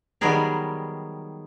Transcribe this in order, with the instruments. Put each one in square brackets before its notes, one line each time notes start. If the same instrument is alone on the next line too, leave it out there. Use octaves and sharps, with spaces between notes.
[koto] D#3 F#3 G3 B3 G#4 A#4